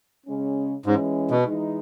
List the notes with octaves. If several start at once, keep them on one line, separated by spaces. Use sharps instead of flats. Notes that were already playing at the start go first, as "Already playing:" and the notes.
C#3 G#3 C#4
G#2 E3 G#3 C#4
B2
E3 G#3 D#4